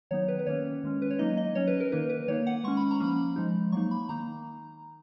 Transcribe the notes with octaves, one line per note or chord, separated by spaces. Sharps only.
D#3 F#3 B3 D#4 C#5
B4
B4
D#3 A#3 C#4 C#5
D#3 G#3 C#4
B4
C#5
F#3 A#3 D#4 D#5
D#5
F#3 C#4 C#5
B4
A#4
D#3 A#3 D#4 B4
B4
D#3 A#3 D#4 C#5
F#5
G#3 C#4 C#6
B5
A#5
F3 A#3 C#4 B5
F3 G#3 D#4
F#3 A#3 D#4 C#6
B5
D#3 A#3 D#4 A#5